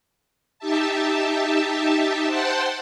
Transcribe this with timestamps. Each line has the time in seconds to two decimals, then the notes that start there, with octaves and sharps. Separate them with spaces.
0.59 D#4 G4 E5 A5
2.26 C5 F#5 G5 A5 C6